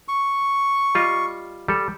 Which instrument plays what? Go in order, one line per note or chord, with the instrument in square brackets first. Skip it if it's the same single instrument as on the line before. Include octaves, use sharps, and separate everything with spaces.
[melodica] C#6
[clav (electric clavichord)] G3 F4 D#5
G3 A4